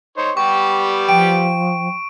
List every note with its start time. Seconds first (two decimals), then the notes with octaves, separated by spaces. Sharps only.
0.17 D#4 C5 C#5
0.37 G3 B3 G4 C#6
1.09 F3 G5 D7